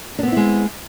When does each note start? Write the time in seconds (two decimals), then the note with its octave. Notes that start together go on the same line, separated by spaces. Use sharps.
0.19 D4
0.23 B3
0.27 C4
0.32 E4
0.36 G#3